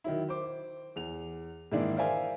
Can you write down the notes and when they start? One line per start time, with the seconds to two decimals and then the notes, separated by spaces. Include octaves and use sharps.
0.04 D#3 F#3 E4
0.29 C5 D6
0.96 E2 F7
1.72 G#2 D#3 E3 A#3 D4 E4
1.97 A#4 C5 D5 E5 F5 G#5